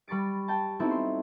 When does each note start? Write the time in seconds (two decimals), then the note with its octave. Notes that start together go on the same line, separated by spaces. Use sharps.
0.08 G3 B5 C#6 A6 D7
0.48 G5 A5
0.80 B3 C4 D#4 E4 F#4 A4
0.91 C6